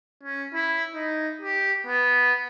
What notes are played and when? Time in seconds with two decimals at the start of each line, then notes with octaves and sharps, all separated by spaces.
0.23 C#4
0.54 E4
0.94 D#4
1.41 G4
1.86 B3